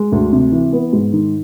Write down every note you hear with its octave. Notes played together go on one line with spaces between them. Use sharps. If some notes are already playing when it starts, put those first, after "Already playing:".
Already playing: G#3
D2
C3
E3
B3
G#2
D#3